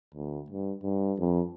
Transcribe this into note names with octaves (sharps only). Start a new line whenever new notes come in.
D2
G2
G2
F2